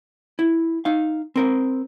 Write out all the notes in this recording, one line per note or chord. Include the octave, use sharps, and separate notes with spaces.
E4
D#4 F5
C4 A#4 C5